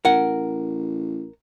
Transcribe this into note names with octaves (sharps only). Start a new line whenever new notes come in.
A1 A#4 F#5